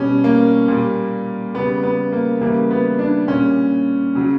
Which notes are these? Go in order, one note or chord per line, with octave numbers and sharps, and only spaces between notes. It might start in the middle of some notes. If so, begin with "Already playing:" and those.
Already playing: B2 G3 C#4
A#3
A#2 G3
C#3 G3 B3
B3
A#3
C#3 E3 G3 A#3
B3
D4
A#2 G3 C#4
C#3 F#3